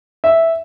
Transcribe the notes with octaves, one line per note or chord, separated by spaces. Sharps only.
E5